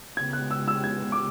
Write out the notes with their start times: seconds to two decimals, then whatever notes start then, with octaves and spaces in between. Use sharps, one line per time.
0.16 C#3 G#3 B3 G#6
0.33 F#6
0.51 E6
0.68 E6
0.84 G#6
1.12 D6